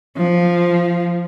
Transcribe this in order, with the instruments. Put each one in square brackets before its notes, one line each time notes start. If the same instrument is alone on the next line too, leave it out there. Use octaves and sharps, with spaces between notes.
[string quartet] F3